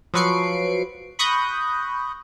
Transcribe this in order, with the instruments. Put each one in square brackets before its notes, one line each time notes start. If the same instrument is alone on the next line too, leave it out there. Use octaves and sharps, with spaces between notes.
[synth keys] F3 F#3 B4 C#6 C7 D7
B5 C#6 D#6 F#6 G6 A#6